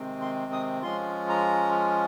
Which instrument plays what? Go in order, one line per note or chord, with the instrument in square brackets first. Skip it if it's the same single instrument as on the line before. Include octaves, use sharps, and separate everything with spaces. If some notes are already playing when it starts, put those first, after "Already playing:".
Already playing: [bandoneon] C3 D#3 G#3 C4
C6
D#6
F3 G#3 C#4 F4 C6
A#5